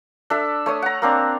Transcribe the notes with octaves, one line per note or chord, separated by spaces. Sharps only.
D4 A4 E5
A3 C#5 D#6
F#5 A#5
A#3 C4 D4